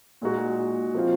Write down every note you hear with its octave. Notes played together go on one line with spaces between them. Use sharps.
A#2 G#3 D#4 F#4
F3 C4 F4